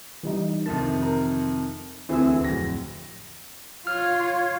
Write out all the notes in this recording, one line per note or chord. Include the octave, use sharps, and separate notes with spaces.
E3 G3 D#4
F2 C3 D#3 A5
A#4
D2 E3 C4 G#4 E6
D1 F2 A#6
F4 C#5 F6